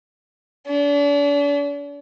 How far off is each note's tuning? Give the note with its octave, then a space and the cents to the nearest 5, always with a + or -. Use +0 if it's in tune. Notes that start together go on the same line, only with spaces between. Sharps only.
D4 -40